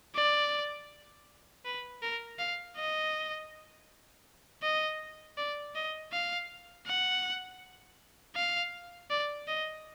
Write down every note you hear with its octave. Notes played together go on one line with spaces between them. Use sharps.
D5
B4
A#4
F5
D#5
D#5
D5
D#5
F5
F#5
F5
D5
D#5